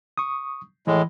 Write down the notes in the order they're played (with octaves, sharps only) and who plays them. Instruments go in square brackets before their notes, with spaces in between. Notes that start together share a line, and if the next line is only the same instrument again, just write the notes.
[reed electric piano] C#6 D#6
[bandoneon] A2 G#3 [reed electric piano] E3